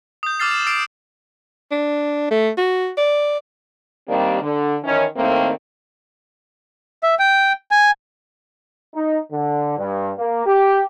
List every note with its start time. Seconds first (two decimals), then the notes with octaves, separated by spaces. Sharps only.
0.23 D#6 G6
0.40 D6 E6 F6 A6 C7
0.51 E7
0.67 D6 E6 A6 C7 D7
1.72 D4
2.31 A3
2.57 F#4
2.97 D5
4.09 D#3 G3 A#3 C4 D4 G4
4.43 D3
4.84 D#3 E3 C#4
5.17 A2 D#3 A3 A#3 C4
7.03 E5
7.19 G5
7.71 G#5
8.95 D#4
9.32 D3
9.78 G2
10.18 A#3
10.46 G4